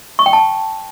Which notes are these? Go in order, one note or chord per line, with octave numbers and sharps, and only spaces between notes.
C#6
G5
A5